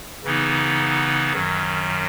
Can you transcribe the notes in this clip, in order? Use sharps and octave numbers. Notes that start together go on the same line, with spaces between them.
C#3 E3 B3 D#4
F#2 D#3 F#3